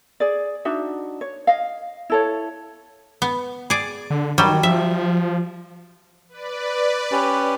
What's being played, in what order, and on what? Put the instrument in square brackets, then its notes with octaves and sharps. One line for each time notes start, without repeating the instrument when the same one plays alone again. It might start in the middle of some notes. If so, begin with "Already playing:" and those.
[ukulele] G#4 D5
D4 D#4 F#4 E5
C#5
D#5 F5
E4 A4 C#5
[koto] B3
G#4 D5
[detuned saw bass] D3
[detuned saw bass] D#3 [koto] F#3 G3
[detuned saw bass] F3 [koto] E5
[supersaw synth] B4 D5
[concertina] C#4 G4 B4